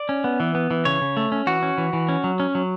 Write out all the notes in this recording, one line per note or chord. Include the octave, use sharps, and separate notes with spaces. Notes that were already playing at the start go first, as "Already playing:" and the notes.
Already playing: D5
C#4
B3
E3
B3
E3
C#3 C#5
C#3
A3
C#4
E3 F#4
C#4
E3
E3
C#4
F#3
C#4
F#3